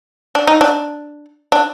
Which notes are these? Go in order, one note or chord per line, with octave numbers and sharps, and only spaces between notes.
D4
D#4
D4
D4